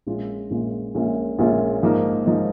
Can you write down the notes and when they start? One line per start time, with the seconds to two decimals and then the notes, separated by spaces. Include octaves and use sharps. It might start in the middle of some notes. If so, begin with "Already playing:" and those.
0.07 A#1 A#2 G#3 C#4 F4
0.50 A#1 A#2 G#3 C#4 F4
0.95 A#1 A#2 G#3 C#4 F4
1.39 A#1 A#2 G#3 C#4 F4
1.83 G#2 F3 A#3 D#4
2.26 G#2 F3 A#3 D#4